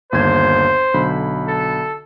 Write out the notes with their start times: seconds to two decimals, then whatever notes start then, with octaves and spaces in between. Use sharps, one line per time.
0.12 G1 D#2 C5 G#6
0.94 B1 D3 B5
1.48 A4